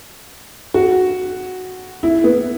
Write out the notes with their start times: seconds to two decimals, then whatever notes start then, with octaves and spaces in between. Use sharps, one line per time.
0.74 F#4
2.03 E4
2.24 B3